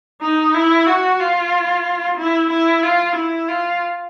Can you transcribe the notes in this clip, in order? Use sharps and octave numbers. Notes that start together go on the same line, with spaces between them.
D#4
E4
F#4
F4
E4
E4
F4
E4
F4